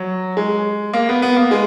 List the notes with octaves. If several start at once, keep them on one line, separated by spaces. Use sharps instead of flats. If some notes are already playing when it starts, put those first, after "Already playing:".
Already playing: F#3
G#3
A#3
B3
B3
A#3
G#3